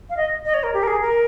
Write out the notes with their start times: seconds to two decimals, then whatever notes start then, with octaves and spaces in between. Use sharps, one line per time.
0.10 F5
0.17 D#5
0.45 D#5
0.54 C#5
0.63 A#4
0.74 G4
0.83 A#4
0.87 G#4
1.01 A#4